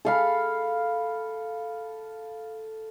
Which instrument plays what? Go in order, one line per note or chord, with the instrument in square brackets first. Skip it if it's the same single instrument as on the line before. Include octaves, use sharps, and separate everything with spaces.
[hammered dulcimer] A4 F5 B5